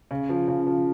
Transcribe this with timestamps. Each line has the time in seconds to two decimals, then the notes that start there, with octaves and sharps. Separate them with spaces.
0.11 C#3
0.29 F3
0.48 C#3
0.67 F3